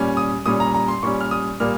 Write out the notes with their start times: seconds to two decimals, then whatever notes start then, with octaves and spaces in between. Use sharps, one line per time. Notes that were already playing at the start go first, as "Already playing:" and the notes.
Already playing: A#2 G3 C#4
0.17 D#6
0.46 A#2 G3 C#4 D#6
0.60 A#5
0.74 A#5
0.88 C6
1.03 A#2 G3 C#4 C#6
1.21 F6
1.31 D#6
1.60 A#2 G3 A#3 F6